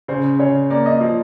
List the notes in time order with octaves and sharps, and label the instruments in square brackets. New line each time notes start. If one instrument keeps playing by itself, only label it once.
[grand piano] C#3 [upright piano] C5
[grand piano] C#3 [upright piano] C#5
[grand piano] A#3 [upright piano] D5
[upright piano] D#5
[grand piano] F3 [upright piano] C5